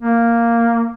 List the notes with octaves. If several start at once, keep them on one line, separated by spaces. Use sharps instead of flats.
A#3